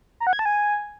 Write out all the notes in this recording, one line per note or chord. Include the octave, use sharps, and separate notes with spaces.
A#5
F#5
G#6
A5
G#5